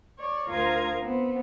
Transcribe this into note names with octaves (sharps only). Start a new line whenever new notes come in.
C#5 D5
D2 F4 A#4 C5 D#6 G#6
B3 C4